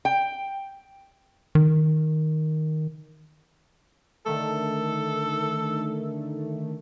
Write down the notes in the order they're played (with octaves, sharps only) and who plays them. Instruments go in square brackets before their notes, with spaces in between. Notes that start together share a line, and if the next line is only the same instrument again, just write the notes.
[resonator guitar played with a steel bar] G5
[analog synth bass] D#3
[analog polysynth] D3 D#3 A3 [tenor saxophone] A4